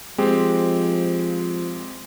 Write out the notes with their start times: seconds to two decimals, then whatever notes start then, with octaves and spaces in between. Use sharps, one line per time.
0.18 F3 G#3 C4 G4